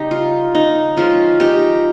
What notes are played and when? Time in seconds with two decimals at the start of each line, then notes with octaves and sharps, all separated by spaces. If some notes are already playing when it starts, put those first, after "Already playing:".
Already playing: C#3 G3 C#4 D#4 G4 D#5
0.11 F4
0.55 D#4
0.97 F3 G#3 C#4 F4
1.40 D#4 G4